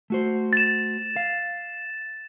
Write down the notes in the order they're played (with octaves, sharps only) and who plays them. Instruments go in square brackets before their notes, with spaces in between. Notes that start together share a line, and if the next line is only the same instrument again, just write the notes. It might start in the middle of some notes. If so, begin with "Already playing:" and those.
[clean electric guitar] A3 F#4 C5
[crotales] A6 E7
[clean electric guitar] F5